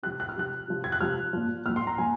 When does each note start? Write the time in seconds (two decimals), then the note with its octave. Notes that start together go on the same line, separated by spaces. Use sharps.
0.03 C3 F3 F#6
0.20 F#6
0.29 F6
0.36 C3 F3 F#6
0.68 C3 F3
0.84 G#6
0.92 F#6
1.01 C3 F3 F6
1.33 A#2 F3
1.66 A#2 F3 F6
1.76 C6
1.87 A#5
1.98 A#2 F3 G#5